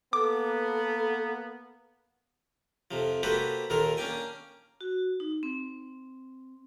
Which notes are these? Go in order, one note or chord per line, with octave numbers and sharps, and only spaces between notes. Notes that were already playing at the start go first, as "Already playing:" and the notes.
A#3 B3 A4 D6
F2 C3 F3
A#3 F#4 G4 A4 B4 C5
D#2 A#2 D#3 A4 A#4 C6
A#3 C#4 D4 G5 G#5
F#4
D#4
C4